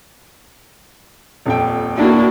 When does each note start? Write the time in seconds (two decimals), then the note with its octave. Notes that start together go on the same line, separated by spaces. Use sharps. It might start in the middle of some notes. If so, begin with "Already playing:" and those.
1.45 D#1 F2 G5
1.96 A#3 D4 E4 F#4